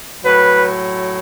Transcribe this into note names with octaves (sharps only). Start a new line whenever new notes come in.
A2 F#3 B4